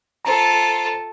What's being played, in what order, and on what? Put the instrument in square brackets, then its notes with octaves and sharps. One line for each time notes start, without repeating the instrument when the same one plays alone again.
[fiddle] F4 A4 [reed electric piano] C5 A#5